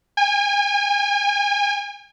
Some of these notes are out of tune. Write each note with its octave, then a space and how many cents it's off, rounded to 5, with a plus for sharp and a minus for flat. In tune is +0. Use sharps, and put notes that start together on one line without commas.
G#5 -35